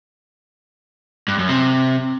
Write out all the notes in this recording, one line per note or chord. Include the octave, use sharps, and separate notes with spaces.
G2
F#2
C3